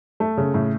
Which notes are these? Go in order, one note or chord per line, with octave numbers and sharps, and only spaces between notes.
A3
C#3
A2